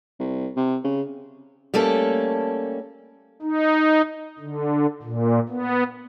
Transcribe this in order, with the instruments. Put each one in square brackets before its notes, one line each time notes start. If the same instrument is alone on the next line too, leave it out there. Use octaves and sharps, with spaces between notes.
[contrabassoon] C2
C3
C#3
[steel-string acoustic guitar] G3 A3 A#3 C#4 A4
[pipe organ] D#4
D3
A#2
B3